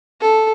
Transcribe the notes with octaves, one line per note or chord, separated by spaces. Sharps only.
A4